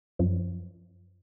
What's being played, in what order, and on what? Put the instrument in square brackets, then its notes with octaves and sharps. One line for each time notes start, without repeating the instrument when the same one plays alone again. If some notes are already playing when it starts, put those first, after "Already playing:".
[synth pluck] F#2 F3